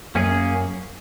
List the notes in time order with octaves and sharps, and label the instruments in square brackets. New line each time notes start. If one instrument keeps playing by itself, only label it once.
[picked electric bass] F#2 [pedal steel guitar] A#3 C#4 G#4